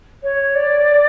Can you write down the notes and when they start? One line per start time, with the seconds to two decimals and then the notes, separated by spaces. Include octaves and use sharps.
0.22 C#5
0.54 D5